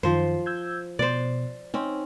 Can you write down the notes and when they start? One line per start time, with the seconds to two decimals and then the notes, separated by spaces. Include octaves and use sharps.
0.03 F#2 D#3 F3 C5
0.46 E6 G6 G#6
0.99 B2 C5 D5
1.74 C4 C#4 D#4